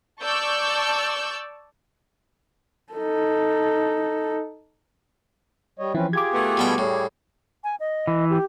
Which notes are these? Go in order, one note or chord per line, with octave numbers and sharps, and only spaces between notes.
D5 A5 C#6 E6 G6
D#4 A4
G3 C#5 D#5
E3 F3 C4 C#4 E4 B4
F4 G4 G#4 D6 G#6
A3 B3
B2 G3 G5
A2 G3 G#4 C#5
G#5
D#5
E3
G4